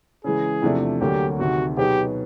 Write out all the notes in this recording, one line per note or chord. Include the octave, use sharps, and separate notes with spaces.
C#3 E3 G#3 G#4
E2 C3 F3 A3 D4
D2 D3 F#3 A#3 G4
D2 C3 D#3 F#4
B2 F#3 B3 D#4 G4 G#4